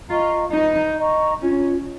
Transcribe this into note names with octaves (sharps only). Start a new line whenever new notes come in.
F4 D#5 A#5 C#6
D#4 B4
D#5 A#5 C#6
C#4 F4